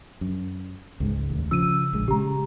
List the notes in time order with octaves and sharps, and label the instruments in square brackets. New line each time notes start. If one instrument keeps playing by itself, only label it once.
[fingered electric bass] F#2
C#2 G#2 G#3
A1 D#2
[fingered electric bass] C#3 F3 [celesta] E6 D#7
[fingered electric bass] A#1 G#3
[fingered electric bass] C#3 G#3 [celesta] G4 A#5